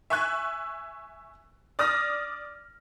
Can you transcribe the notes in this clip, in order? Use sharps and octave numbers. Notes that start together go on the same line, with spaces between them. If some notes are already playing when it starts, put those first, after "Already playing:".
E5 G#5 C#6 E6 F#6 G#6
D5 D#6 F6 A#6